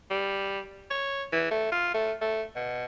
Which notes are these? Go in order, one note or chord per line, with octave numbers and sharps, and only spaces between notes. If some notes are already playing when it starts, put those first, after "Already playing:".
G3
C#5
E3
A3
F4
A3
A3
B2